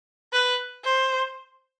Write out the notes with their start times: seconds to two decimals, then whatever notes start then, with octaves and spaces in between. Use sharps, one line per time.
0.33 B4
0.85 C5